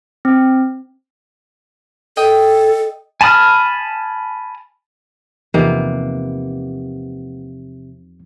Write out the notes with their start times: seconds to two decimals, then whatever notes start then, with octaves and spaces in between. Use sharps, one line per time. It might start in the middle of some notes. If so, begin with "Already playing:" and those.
0.25 C4
2.17 A4 D#5 G5
3.21 G#5 A5 B5 D#6 F6
5.54 E2 C3 F3 A#3 B3 D#4